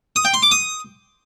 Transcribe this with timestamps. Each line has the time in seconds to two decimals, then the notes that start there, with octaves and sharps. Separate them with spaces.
0.16 D#6
0.25 G5
0.34 C6
0.43 D6
0.51 D#6